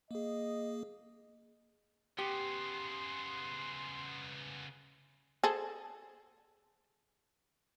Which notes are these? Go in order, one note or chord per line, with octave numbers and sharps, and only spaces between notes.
A#3 G#4 D#5
C#3 B3 G4 C6
G#4 A4 C5